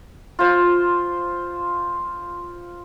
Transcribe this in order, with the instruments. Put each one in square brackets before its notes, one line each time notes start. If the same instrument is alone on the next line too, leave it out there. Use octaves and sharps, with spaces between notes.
[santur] F4 C5